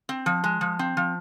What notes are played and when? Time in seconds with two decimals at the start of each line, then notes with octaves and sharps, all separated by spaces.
0.09 C4
0.26 F3
0.44 G#3
0.61 F3
0.79 C4
0.97 F3